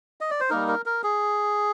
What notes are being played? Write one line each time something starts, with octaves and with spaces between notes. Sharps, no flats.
D#5
D5
C5
G3 A#3 D#4 A#4
A#4
A#4
G#4